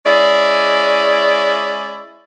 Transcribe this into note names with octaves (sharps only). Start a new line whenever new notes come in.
G#3 C#4 E4 D5